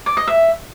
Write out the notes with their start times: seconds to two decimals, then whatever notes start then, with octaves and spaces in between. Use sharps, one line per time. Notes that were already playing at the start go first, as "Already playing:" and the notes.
0.06 D5
0.17 D#5
0.27 E5